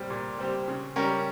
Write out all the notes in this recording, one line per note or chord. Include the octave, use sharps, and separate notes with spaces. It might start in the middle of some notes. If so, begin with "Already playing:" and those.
Already playing: A#2 G3 C4 G4
A#2
G3 C4 G4
C#3
G3 C#4 G4 A#4